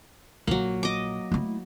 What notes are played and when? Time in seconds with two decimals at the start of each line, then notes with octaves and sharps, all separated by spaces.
0.47 A#1 F#3 A#3 F4
0.83 D#5 D6
1.32 A3 E4